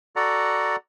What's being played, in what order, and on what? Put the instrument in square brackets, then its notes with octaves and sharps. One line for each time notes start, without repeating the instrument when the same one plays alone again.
[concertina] F#4 A4 D5 F#5 A#5